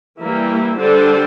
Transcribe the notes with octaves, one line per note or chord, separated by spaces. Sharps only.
E3 G3 A#3 E4
D3 G3 D4 A4 C5